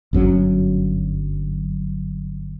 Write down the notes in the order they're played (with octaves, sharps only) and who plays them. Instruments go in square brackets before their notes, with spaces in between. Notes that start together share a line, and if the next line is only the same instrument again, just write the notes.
[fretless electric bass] G1 F#2 F#3 C#4